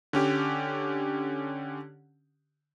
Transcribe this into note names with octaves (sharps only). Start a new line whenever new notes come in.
D3 C#4 G4